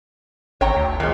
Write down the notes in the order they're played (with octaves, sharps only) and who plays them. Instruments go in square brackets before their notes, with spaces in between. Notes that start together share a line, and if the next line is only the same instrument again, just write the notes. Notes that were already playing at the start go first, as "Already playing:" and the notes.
[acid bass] G#1 [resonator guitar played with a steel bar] C#5 G5 A#5
[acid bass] D2
[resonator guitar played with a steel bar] A#2 G#3 [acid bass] D#3